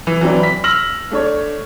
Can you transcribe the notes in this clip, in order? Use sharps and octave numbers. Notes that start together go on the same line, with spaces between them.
E3
E3 F#3 C4 D4
B5 B6
E6 F6 A#6 F#7
A3 D4 C#5